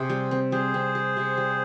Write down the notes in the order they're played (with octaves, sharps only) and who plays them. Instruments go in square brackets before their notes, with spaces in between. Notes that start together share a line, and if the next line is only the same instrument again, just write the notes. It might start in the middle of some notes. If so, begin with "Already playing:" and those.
Already playing: [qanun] C3 C4 [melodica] G#4 C5
[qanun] G3
C4
[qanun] G3 [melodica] G#4 C5
[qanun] C4
G4
C3
G3